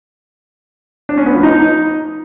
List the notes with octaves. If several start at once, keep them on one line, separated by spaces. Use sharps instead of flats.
D4
C#4
B3
F3
D#4